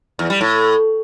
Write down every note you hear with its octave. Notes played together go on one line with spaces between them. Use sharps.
E2
G3
A2